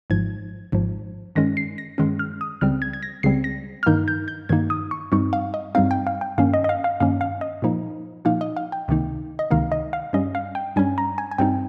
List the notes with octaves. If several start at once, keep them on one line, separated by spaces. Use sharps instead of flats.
G#1 G#2 F3 G#6
G#1 G#2 F3
G2 D#3 G#3 C#4 A#6
C7
A#6
G2 D#3 G#3 C#4
F6
D#6
C#2 C#3 G3 C4 F6
G#6
G#6
A#6
C#2 C#3 G3 C4 C7
A#6
F6
G2 D#3 A#3 D#4 G6
G6
G6
G2 D#3 A#3 D#4 G#6
D#6
C#6
G2 G3 C4 D#4 C#6
F5
D#5
G2 G3 C4 D#4 F5
G5
F5
G5
G2 D#3 A#3 C#4 F5
D#5
D#5
F5
F5
G2 D#3 A#3 C#4 F5
F5
D#5
A#2 F3 A#3 D#4
A#2 F3 A#3 D#4 F5
D#5
F5
G5
C#2 C3 D#3 A#3 D#4
D#5
C#2 C3 D#3 A#3 D#4 F5
D#5
F5
G2 G3 C#4 D#5
F5
G5
G2 G3 C#4 G#5
A#5
G#5
G#5
G2 G3 C4 D#4 G5